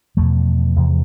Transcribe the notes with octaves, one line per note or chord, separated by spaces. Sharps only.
E2 B2 F3 A3
E2 C3